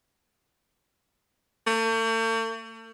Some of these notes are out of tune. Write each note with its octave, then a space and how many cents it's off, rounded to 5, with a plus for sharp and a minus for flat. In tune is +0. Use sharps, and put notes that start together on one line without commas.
A3 +45